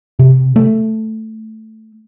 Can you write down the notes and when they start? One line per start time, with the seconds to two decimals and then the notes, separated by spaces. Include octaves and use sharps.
0.19 C3
0.56 A3